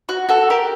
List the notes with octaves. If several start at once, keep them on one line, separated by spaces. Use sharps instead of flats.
F#4
F#4 A4
G4 A#4